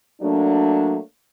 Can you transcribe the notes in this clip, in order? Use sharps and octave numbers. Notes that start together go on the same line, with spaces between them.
F#3 A3 A#3 D4